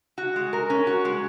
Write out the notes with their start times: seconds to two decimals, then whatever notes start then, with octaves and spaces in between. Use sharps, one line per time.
0.18 F#4
0.36 G#3
0.53 A#4
0.70 C#4
0.87 F#4
1.05 G#3